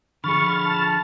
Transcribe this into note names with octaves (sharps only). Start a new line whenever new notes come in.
D3 F3 G#4 B5 C#6 F6 A6
A5